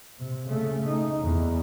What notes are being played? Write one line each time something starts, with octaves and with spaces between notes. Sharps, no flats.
C3
C#3 A3
D#4
E2